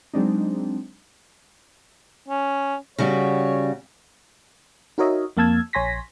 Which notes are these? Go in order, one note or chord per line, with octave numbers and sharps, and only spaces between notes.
F#3 G#3 C4 D4 D#4
C#4
C#3 G3 F#4 C#5
D#4 F#4 A#4 C#5 D#5 E5
F2 A#3 F5 A5 E6 G#6
A#1 C#5 G#5 C6 A#6 B6